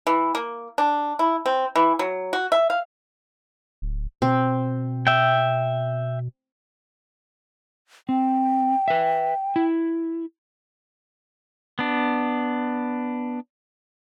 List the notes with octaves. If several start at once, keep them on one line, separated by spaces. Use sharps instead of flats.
E3
A#3
D4
E4
C4
E3
F#3
F#4
E5
F5
D1
B2 C4
E5 G5
C4 G5
B4 E5
E4
B3 D4